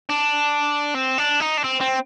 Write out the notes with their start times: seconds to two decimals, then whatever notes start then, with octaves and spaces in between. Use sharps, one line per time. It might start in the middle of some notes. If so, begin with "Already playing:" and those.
0.10 D4
0.95 C4
1.18 D4
1.40 D#4
1.57 D4
1.64 C4
1.81 C4